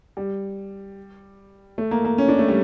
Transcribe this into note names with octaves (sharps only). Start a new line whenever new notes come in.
G3
A3
A#3
A#3
C#4
D4
A3
G3